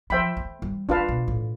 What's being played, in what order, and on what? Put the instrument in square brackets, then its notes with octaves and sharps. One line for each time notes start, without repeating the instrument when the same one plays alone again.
[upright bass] F3 [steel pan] C5 E5 G5 B5
[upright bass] A3
G3
[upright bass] G3 [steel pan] D4 F4 B4 F5 A5
[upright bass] B2
A2